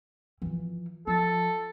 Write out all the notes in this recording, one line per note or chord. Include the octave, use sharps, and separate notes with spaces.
E3 F3
F3 A4